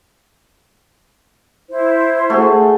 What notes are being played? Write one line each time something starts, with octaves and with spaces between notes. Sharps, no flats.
E4 C5
A3 F#4 G#4